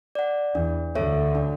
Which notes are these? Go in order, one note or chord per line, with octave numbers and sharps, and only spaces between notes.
D5 F#5
E2 E3 D4
D2 D3 A4 C#5 E5
D4